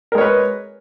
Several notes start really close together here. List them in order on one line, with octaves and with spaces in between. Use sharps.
A#4 G#3 C#5 B4